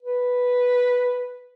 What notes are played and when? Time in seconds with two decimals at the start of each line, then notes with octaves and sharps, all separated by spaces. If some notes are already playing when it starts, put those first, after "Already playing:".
0.03 B4